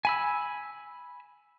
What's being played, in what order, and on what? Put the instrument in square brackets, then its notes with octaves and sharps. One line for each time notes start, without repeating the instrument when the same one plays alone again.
[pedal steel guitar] G#5 B5 E6